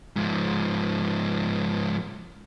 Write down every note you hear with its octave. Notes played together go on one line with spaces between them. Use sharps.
G#2 F3